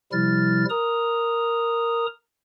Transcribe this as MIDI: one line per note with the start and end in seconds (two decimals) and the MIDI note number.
0.12 0.65 48
0.12 0.65 53
0.12 0.65 55
0.12 0.65 64
0.12 0.65 89
0.12 0.65 93
0.70 2.06 70
0.70 2.06 82
0.70 2.06 87